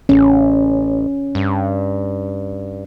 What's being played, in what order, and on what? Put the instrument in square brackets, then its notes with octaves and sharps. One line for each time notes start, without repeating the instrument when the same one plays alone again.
[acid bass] A1 [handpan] C#4
[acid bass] G2